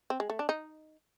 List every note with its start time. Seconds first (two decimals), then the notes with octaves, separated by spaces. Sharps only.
0.10 C4
0.20 G#3
0.30 A3
0.39 D4
0.49 D#4